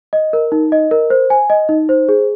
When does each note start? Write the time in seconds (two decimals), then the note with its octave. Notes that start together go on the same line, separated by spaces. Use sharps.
0.13 D#5
0.33 A#4
0.52 D#4
0.72 D#5
0.91 A#4
1.10 C5
1.30 G#5
1.50 D#5
1.69 D#4
1.89 C5
2.09 G#4